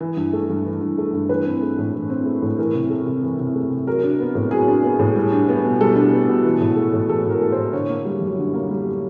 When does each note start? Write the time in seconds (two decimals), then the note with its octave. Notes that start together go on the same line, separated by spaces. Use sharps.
0.01 E3
0.17 G2
0.33 A3
0.50 G2
0.66 E3
0.81 G2
0.98 A3
1.13 G2
1.29 E3 B4
1.46 C4
1.62 A3
1.79 A2
1.94 E3
2.10 C4
2.26 A3
2.42 A2
2.58 E3 A#4
2.75 C3
2.90 A3
3.06 C3
3.23 E3
3.39 C3
3.55 A3
3.71 C3
3.87 F#3 A#4
4.03 D4
4.20 B3
4.35 A2
4.51 F#3 G#4
4.68 D4
4.84 B3
4.99 A2
5.15 G3
5.32 D4
5.49 B3
5.65 B2
5.80 G3 A4
5.96 D4
6.13 B3
6.28 B2
6.44 E3
6.60 A2
6.76 A3
6.93 A2
7.09 E3 A4
7.25 A2 A#4
7.41 A3
7.52 A2 C5
7.73 D3 C#5
7.89 A#3
8.05 G3
8.21 F#2
8.38 D3
8.53 A#3
8.69 G3